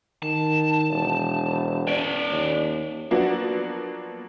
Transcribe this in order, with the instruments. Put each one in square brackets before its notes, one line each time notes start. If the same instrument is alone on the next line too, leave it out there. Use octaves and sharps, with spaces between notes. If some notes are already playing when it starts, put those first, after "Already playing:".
[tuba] D#3 [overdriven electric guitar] A5
[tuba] E1
[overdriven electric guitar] C#4 D5
[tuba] D#2
[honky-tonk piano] F3 F#3 A#3 B3 D4 F#4